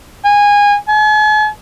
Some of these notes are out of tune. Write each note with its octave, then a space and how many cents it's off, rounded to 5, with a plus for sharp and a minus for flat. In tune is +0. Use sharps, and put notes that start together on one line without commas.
G#5 -20
G#5 +45